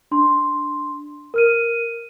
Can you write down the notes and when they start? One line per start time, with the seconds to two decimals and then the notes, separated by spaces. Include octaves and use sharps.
0.11 D4 C6
1.34 A#4 F6 D#7